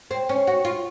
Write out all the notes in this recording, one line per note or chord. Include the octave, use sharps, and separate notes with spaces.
C4
C#4
F#4
F4